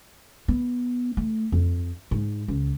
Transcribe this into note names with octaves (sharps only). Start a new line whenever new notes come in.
B3
A3
F2
G#2
C#2